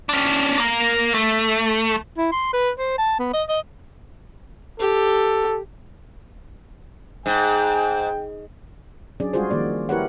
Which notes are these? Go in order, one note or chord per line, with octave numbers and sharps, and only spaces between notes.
C#4 D4
A#3 A#4
A3
E4
C6
B4
C5
A5
B3
D#5
D#5
G4 A4
G#2 G5
F#3 C#4 D4 G#4 D5
G3 G#3 F4 F#4 G#4 C5
D#3 F3 A#3 D5
E4 G4 A#4 B4 C#5 F#5